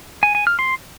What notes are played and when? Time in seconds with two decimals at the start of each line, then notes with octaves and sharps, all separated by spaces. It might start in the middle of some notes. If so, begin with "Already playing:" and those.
0.23 G#5
0.35 G#5
0.47 F6
0.59 C6